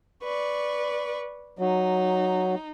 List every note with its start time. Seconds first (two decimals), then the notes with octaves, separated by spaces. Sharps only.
0.22 B4 D5 C#6
1.59 F#3 D#4